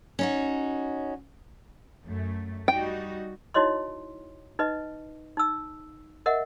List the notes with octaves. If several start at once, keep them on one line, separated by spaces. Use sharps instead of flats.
C#4 D#4 F#4
F#2 A3
G3 D#4 F#4 G5
D#4 E4 F#4 C#5 D#5 C6
D#4 B4 D#5
D#4 E6
A#4 D#5 E5 F#5